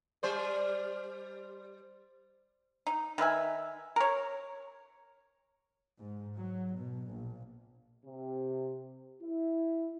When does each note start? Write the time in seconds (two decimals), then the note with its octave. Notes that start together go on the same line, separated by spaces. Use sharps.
0.23 G3 C5 D5
2.87 D#4
3.18 D#3 B4 E5 G#5
3.96 A#4 C#5
5.97 G#2
6.38 F#3
6.77 B2
7.09 A#1
8.06 C3
9.22 E4